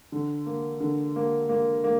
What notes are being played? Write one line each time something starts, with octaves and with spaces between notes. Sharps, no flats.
D3
A#3
D3
A#3
A#3
A#3